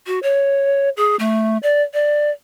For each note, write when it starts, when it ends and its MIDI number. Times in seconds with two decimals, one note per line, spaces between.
0.07 0.19 66
0.23 0.89 73
0.97 1.16 68
1.19 1.58 57
1.63 1.82 74
1.94 2.31 74